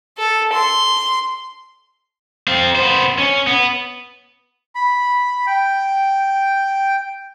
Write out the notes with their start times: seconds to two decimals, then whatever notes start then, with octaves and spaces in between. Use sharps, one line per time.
0.17 A4
0.53 C6
2.48 C4 F5
2.76 B3 C5
3.19 C#4
3.47 B3
4.75 B5
5.47 G5